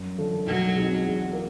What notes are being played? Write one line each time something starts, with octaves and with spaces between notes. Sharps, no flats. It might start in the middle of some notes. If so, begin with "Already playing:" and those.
Already playing: F#2
D3 F3 A3
B1 F#3
B2 G#3 C4 D#4
E2
A#3